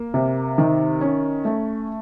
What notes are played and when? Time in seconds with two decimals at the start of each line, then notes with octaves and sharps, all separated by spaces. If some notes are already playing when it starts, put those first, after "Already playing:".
Already playing: A#3
0.14 C3
0.58 D#3
1.01 C#4
1.45 A3